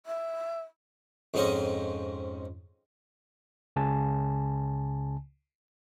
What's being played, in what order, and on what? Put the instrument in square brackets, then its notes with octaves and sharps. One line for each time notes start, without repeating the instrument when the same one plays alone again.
[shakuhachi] E5
[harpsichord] F2 G#2 C4 C#4 D#5
[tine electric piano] C#2 C#3 G#5 A5